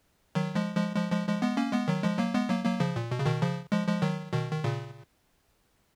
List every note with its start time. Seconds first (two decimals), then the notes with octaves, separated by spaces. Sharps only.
0.35 D#3 F#3
0.55 F3 G#3
0.76 F3 G#3
0.96 F3 G#3
1.11 F3 G#3
1.27 F3 G#3
1.42 G#3 B3
1.57 A#3 C#4
1.73 G#3 B3
1.88 D#3 F#3
2.03 F3 G#3
2.18 F#3 A#3
2.34 G#3 B3
2.49 F#3 A#3
2.64 F#3 A#3
2.80 C#3 F3
2.96 A#2
3.11 B2
3.20 C#3
3.25 B2 D#3
3.42 C#3 F3
3.72 F3 G#3
3.87 F3 G#3
4.02 D#3 F#3
4.33 B2 D#3
4.51 D#3
4.64 A#2 C#3